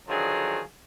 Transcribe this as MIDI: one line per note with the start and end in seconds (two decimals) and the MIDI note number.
0.09 0.60 50
0.09 0.60 51
0.09 0.60 53
0.09 0.60 54
0.09 0.60 68